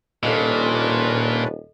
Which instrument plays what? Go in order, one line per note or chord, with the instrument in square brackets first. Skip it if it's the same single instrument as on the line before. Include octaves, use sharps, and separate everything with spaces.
[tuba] D#1 [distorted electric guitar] A#2 [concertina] C#4 D4 B4 [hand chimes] A4 D#5